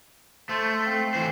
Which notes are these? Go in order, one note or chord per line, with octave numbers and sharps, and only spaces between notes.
A3 C5 A5
C4 F5
E3 C5